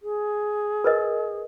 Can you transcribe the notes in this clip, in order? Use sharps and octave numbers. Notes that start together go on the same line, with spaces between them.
G#4
A#4 B4 D#5